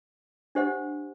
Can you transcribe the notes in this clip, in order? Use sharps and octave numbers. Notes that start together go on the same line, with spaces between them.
D4 G4 C5 D#5 F#5